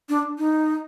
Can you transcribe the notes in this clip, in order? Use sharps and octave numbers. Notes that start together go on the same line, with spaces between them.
D4
D#4